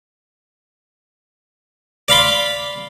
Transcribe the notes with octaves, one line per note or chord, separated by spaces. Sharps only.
D5 F5 B5 C6